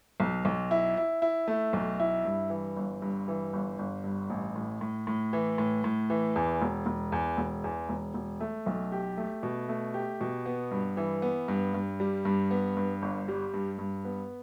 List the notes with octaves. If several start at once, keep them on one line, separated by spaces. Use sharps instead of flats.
B1
B1
E4
E4
E4
A3
B1
E4
G2
E3
G1
G2
E3
G1
G1
G2
A1
A2
A2
A2
E3
A2
A2
E3
E2
E1
E1
E2
E1
E2
E1
E1
A3
B1
G4
A3
B2
A3
G4
B2
B3
G2
E3
B3
G2
G2
G3
G2
B3
G2
G1
G3
G2
G2
B3